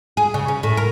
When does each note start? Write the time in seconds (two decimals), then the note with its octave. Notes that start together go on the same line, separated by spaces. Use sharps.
0.17 G#4
0.34 C#3
0.48 C#4
0.63 A2
0.77 A#4